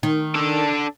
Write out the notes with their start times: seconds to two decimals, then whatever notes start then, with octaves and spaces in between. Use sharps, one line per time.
0.03 D#3
0.35 D4 A4